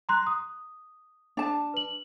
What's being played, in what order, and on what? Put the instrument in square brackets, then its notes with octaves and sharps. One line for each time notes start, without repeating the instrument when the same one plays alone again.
[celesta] A#5 C6 F#6
D#6
[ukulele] D4 A5
[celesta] B4 F#7